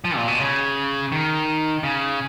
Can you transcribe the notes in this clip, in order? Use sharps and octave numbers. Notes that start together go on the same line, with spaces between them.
F3
A#2
B2
C#3
D#3
C#3